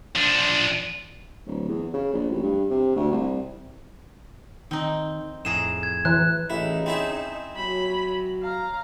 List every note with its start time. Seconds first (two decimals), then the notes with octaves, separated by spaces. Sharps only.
0.15 F3 D4
1.47 D1
1.69 E2
1.94 C#3
2.13 A#1
2.30 A1
2.43 G2
2.70 C3
2.96 D2
3.11 C2
4.71 D#3 C4 D#4
5.45 F2 A2 G#4 A#5 E7
5.83 G#6
6.05 E3 F#6
6.50 A1 C#3 D#4 E4
6.86 C4 E4 G#4
7.56 F#3 B5
8.43 F5 A#5